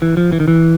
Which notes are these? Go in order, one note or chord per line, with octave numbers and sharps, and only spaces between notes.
E3
F3
E3
D#3
E3